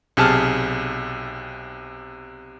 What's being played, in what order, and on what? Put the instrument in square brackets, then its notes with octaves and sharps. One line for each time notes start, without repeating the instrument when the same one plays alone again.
[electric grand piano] B1 C3 G#4 A5 F6